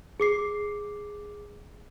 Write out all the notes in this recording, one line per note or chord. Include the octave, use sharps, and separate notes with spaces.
G#4 D6 C7